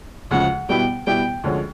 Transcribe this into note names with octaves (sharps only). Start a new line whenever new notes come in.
D2 C#3 F3 G#3 F#5
B2 G3 B3 E4 G4 G5
B2 G3 B3 E4 G4 G5
D2 D3 F3 G#3 C#4